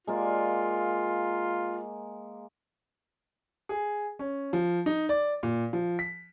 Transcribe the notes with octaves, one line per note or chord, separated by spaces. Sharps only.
G#3 A#3 F4 D5
G#4
C#4
F3
D#4
D5
A#2
F3
B6